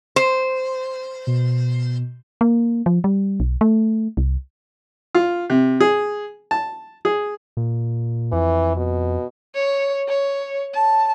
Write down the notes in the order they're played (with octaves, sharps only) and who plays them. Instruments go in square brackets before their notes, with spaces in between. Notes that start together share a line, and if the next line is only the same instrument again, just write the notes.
[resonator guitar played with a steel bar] C5
[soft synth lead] B2
[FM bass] A#3
F3
G3
B1
A3
C2
[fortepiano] F4
C3
G#4
A5
G#4
[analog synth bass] A#2
[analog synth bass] F2 [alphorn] E3
[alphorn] B2
[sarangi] C#5
C#5
A5